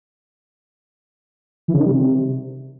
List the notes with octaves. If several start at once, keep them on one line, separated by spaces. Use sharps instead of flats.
E3
C#3
D#3
G3
C3